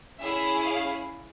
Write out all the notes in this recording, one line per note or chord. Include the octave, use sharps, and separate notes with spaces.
C#4 E4 G#4 E5
F5